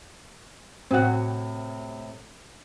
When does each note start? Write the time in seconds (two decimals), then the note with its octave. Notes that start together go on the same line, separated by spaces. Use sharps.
0.91 A2 C3 C4 F#4 F#5